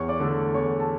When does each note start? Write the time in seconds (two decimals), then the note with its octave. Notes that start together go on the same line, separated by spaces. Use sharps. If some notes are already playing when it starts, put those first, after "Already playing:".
Already playing: E2 C#5 C#6
0.08 D5 D6
0.20 D3 A3
0.54 E2 C#5 C#6
0.80 A5